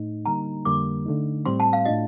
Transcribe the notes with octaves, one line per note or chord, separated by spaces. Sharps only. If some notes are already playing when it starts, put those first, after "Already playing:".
Already playing: A2 A3 D#4
D3 G3 A#3 D#4 A#5
F2 D3 G3 A#3 D6
D3 A3 D#4
A2 G3 C4 C6
A5
F5
A2 A3 D4 F4 D#5